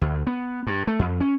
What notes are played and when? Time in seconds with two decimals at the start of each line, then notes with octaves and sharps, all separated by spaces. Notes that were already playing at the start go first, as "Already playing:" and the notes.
0.01 D2
0.27 B3
0.67 G2
0.87 A3
0.99 F2
1.21 C#4